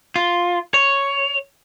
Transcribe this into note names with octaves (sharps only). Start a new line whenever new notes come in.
F4
C#5